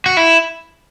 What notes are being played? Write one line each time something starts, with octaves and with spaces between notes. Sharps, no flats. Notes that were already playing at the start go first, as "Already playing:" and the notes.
F#4
E4